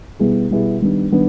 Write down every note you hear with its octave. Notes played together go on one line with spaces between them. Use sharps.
B2 G3 B3 E4 G#4
B2 G3 B3 E4 G#4
D#3 G3 B3 D4
D#3 G3 B3 D4